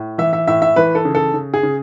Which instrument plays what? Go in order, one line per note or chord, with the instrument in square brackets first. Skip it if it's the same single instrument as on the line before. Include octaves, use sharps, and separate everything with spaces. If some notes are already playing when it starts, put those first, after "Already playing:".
Already playing: [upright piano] A2
E3 E5
E5
A2 E5
E5
E3 B4
A4
C#3
A4
C#3
G#4
C#3